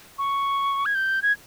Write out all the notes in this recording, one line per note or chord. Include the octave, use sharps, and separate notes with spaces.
C#6
G#6
G6
G#6